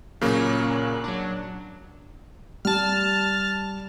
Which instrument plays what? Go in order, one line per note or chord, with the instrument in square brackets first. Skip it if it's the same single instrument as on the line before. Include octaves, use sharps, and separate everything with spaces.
[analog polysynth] A#2 C#4 F#6 [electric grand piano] C#3 F#3 A#3
[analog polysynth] F#3 D4
[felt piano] G3 [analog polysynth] A5 F6